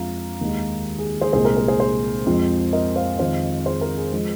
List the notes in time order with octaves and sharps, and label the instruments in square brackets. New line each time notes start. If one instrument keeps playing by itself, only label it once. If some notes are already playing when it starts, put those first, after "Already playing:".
Already playing: [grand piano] F2 F3 G#3 F5 A#5
D#2 D#3 G#3
G#4
G#4 C5
C2 A#2 G#3 G#4 C5
A#4
A#4
G#4 C5
G#4 C5
F2 F3 G#3
A#4 D#5
C5 F5
F2 D#3 G#3 C5 F5
G#4 C5
A#4
G#4
F3 G#3